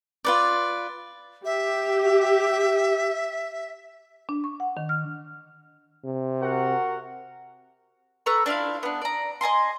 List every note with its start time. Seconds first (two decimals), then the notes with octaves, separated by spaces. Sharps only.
0.25 F4 B4 D5
1.45 G4 E5
4.29 D4
4.44 C#6
4.60 F#5
4.77 D#3
4.89 F6
6.05 C3
6.41 F#4 A#4 F#5
8.26 A4 B4 A#5 C#6
8.46 D4 E4 F4 F5
8.83 B3 D4
9.01 D5 A#5
9.41 D#5 G#5 A#5 C6